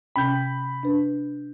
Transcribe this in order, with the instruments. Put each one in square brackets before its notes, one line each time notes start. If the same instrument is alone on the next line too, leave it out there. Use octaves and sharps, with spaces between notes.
[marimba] C3 C#4 G5 [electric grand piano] B5 G6
[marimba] D4 B4